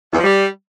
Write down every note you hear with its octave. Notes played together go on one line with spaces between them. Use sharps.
E2
F3
G3